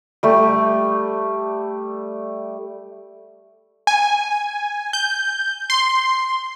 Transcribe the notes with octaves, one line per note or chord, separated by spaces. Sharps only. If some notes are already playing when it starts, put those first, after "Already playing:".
G3 A3 G4
G#5
G6
C6